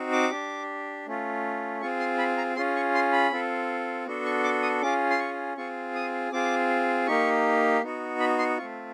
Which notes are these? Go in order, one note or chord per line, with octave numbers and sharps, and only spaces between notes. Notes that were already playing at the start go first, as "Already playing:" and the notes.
Already playing: C4 D#4 F#4
D6
D4 G4
A3 C#4 F4
C4 F4 G#4 C#6
C6
B5
A#5
C#4 F4 G#4 C6
C#6
C6
B5
C4 F4 A4
B3 D4 F#4 A4
C#6
D6
D#6
C#4 F4 G#4 D6
C6
C#6
C4 F4 G#4 C#6
D#6
C4 F4 G#4 D6
A#3 D#4 G4 C#6
B3 D#4 F#4
B5
C6
A3 C4 F4 C#6